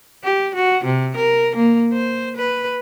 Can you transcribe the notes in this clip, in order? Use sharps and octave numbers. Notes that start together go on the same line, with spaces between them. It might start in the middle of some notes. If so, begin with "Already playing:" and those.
G4
F#4
C3
A#4
A#3
C5
B4